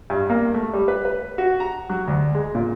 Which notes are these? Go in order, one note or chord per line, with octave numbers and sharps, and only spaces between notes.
G2
A#3
A3
G3
B4
B4
F#4
A#5
F#3
D2
G#3
A#2